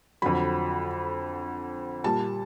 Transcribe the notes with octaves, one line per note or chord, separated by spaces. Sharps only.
F2 D3 F#3 B5
A#2 G3 A5